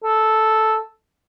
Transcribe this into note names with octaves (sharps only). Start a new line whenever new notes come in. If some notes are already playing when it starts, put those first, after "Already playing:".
A4